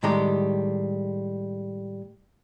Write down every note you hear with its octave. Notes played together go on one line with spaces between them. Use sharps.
A2 D#3 G3 G#3 G4 A#5